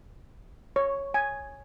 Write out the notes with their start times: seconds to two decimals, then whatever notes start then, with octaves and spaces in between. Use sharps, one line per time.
0.76 C#5
1.14 G#5